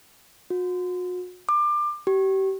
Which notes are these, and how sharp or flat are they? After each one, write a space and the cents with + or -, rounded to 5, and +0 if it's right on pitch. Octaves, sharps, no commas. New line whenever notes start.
F#4 -40
D6 +25
G4 -35